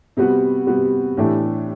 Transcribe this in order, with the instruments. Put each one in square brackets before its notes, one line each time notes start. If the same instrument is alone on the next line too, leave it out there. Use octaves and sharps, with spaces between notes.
[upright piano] C3 G3 B3 F#4
C3 G3 B3 F#4
A2 E3 A3 D4 G4